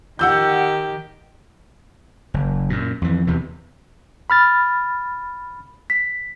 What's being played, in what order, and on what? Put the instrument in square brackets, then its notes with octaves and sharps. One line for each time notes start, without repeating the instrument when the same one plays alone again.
[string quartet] D#3 G4 [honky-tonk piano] F#5 E6 G6
[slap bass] F#1
F#2 A#2
F2 E3
E2 C3 E3
[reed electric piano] B5 F6 A6
[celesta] B6